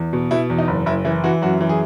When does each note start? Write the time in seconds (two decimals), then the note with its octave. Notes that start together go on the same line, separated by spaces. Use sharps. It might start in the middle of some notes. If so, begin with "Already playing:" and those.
Already playing: E2
0.13 B2
0.31 B2 E4
0.50 E2
0.59 D#4
0.68 F#1
0.86 F#1 E4
1.05 E3 E4
1.24 E3 F#4
1.42 F#2 F#4
1.61 E3
1.69 G#4